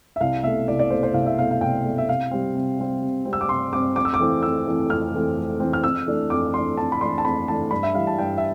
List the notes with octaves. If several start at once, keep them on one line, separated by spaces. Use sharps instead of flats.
E5
C2 F5
B2 A3 E5
C2 D5
D5
B2 A3 C5
C5
C2 F5
E5
B2 A3 F5
F5
C2 G5
B2 A3
E5
C3 F5
G3 C4
C3
G3 C4
C3
G3 C4
E6
D6
C3 C6
G3 C4 D6
F2 D6
E6
D6
E3 A3 C4
F2 E6
E3 A3 C4
F2 F6
E3 A3 C4
F2
E3 A3 C4
F6
F2 E6
E3 A3 D4
F2 D6
E3 A3 D4 C6
F2 A5
B5
E3 A3 D4 C6
A5
F2 B5
E3 A3 D4 A5
G2 B5
E5
E3 G3 F5
A5
G2 G5
E5